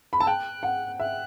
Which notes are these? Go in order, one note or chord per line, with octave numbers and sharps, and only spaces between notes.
B5
A5 E6
G5 F#6
F#5
E5 F#6